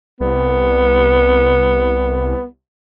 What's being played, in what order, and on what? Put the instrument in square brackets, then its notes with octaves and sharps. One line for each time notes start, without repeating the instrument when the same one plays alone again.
[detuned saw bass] C2 [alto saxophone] B3